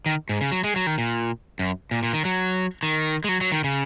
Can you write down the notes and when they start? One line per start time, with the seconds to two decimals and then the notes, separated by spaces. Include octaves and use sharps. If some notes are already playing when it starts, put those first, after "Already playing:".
0.06 D#3
0.29 G#2
0.41 C#3
0.52 F#3
0.64 G#3
0.76 F#3
0.87 D#3
0.98 A#2
1.59 F#2
1.91 A#2
2.03 A#2
2.13 D#3
2.25 F#3
2.83 D#3
3.24 G#3
3.29 F#3
3.41 F#3
3.52 D#3
3.64 C#3